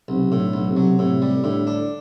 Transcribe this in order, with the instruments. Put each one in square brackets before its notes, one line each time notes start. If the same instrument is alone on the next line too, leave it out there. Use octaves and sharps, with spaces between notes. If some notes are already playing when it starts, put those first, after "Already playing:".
[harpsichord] B1 [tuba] C3
[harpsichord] A2
[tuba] D3
[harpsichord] B1
[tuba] C3
[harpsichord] F#3
[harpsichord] A2 [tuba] C3
[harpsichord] G3
[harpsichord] A2 [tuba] D3
[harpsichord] D4